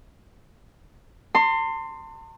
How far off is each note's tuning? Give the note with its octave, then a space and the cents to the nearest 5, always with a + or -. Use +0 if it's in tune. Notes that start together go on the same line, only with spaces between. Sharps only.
A5 +45 C6 +0